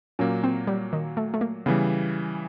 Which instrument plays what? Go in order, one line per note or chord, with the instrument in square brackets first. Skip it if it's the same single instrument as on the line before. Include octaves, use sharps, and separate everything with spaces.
[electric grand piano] A#2 F#3 A#3 [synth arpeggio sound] C#4
[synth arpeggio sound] C4
G3
D#3
A3
A3
A#3
[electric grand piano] C#3 E3 G3 [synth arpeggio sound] B3